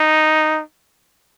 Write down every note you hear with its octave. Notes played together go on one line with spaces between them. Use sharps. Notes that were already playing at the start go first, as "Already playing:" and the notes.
Already playing: D#4